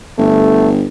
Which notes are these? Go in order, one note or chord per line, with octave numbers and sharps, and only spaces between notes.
G1 A3